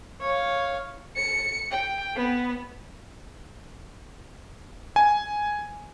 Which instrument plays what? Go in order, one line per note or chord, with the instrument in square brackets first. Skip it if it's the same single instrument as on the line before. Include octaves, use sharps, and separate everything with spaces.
[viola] C#5 F5
[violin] C#7
G5
B3
[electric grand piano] G#5